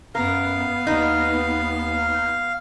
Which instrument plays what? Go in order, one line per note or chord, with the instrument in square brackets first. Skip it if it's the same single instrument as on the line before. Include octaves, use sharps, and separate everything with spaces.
[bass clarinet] F#2 [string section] B3 [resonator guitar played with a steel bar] A#4 [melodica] F5
[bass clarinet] D#2 [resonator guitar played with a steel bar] D#4